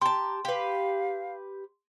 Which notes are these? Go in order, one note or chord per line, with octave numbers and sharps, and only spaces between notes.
G4 A5 A#5 C6
G4 B4 F5